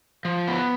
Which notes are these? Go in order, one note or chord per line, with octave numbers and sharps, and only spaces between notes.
F3
B3